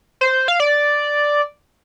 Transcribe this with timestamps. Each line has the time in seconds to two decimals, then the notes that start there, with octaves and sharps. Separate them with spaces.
0.21 C5
0.48 F5
0.60 D5